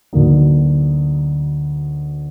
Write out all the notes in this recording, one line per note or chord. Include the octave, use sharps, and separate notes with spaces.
D2 D3 F#3 A#3 D#4